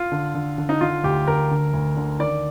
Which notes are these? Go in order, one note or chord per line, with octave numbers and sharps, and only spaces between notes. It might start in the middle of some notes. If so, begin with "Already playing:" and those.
Already playing: F4
D3
D3
D3
D#4
D3 F4
D2 G4
D2 A#4
D3
D2
D3
D#3 D5